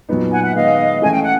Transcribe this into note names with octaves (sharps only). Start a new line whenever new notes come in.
A#2 F#3 B3 D#4
F#5 G#5
E5 F#5
D#3 G#3 B3 D#5 F5
E3 A3 C#4 G#5
G5
F#5